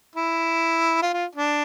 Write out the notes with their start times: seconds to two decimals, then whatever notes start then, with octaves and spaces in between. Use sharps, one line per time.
0.16 E4
1.02 F4
1.14 F4
1.35 D4